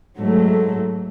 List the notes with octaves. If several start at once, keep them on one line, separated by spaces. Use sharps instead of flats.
G#2 F#3 A3